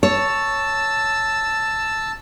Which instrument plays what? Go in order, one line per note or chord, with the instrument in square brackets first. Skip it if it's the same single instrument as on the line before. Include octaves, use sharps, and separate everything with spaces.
[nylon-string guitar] C#5 [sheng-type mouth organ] A5 E6